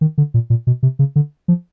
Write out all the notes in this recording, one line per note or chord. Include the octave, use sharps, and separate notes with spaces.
D#3
D3
A#2
A#2
B2
C3
C#3
D3
F3